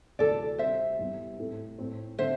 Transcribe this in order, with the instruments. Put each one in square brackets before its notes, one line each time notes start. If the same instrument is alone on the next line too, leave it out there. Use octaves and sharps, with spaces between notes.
[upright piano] D2 C3 E3 [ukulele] A4 D5
[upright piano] C3 G3 C4 A4 [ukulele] C5 E5
[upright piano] E2 E3 G3 C4
A2 A3 C4 E4 A4
A2 A3 C4
[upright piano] D3 C4 A4 [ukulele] C5 E5